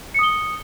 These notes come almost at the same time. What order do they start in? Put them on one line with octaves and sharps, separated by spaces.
C#7 D#6 G7